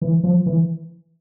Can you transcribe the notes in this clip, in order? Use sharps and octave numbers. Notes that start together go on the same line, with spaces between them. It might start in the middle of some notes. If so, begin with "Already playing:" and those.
E3
F3
E3